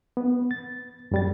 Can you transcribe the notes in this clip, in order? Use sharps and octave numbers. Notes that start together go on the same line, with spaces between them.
B3
A6
F#2 G3 A6